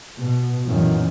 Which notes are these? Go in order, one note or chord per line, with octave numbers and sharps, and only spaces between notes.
B2
F#2 A#2 D#3 E3